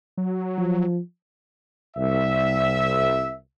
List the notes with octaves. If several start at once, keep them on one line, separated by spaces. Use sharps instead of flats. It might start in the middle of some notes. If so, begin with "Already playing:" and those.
F#3
F3
C2 E5